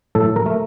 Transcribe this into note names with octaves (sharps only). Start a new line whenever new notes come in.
A2 A4
A#4
A3